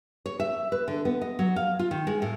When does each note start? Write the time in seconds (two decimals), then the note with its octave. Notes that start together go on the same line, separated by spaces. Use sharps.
0.26 C#5
0.40 E5
0.72 B4
0.88 D3
1.05 B3
1.21 D#5
1.39 F#3
1.56 F5
1.79 F4
1.91 D#3
2.07 G#3
2.22 A2